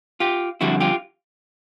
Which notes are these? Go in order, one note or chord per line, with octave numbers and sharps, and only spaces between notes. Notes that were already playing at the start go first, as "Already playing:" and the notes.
F4 G4
F2 D3 G3 E4 F#4
F4 G4